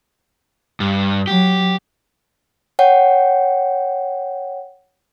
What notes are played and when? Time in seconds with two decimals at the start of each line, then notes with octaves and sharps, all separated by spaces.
0.80 G2
1.27 F#3 G4
2.79 C#5 F#5 G5